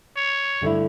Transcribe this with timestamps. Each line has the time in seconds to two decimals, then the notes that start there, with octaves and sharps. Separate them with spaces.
0.17 C#5
0.61 G2 D3 A3 E4